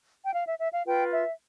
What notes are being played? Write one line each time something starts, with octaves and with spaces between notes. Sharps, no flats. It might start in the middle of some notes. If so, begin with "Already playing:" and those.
G5
F5
E5
E5
F5
F4 B4 G5
E5